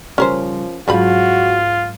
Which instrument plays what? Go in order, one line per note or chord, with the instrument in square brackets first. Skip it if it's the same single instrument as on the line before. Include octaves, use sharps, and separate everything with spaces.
[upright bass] C#3 G3 [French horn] F3 [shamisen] C#4 A#4 C5
[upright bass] G#2 F#3 [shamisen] C#3 F3 B5 [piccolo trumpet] F4 [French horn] F#4